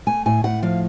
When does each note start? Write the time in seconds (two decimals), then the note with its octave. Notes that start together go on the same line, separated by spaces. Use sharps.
0.07 A3 G#5
0.26 A2 G#5
0.44 A2 F#5
0.63 F3 F5